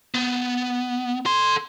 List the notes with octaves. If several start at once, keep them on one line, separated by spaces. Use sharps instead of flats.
B3
A4 C6